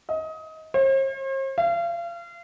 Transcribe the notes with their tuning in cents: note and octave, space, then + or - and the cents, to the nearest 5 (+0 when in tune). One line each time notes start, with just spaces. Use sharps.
D#5 +25
C5 +45
F5 -35